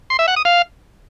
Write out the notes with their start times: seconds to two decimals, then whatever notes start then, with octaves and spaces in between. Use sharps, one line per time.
0.10 C6
0.19 E5
0.28 F#5
0.36 D#6
0.45 F5